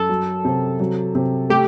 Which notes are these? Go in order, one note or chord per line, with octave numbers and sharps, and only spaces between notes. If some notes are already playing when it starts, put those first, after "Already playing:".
Already playing: F#2 A4
F#3
C3
F#3
C3
A3 G4